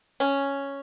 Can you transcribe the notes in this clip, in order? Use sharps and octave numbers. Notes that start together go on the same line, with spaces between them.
C#4